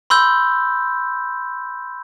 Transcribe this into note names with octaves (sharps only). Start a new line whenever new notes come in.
B5 C6 E6 G6